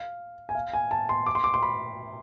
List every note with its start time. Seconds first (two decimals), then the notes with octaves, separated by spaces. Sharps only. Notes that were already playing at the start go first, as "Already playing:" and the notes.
Already playing: F5
0.49 G#5
0.55 F5
0.73 G#5
0.91 A5
1.09 C6
1.26 D6
1.35 C6
1.44 D6
1.54 C6
1.63 B5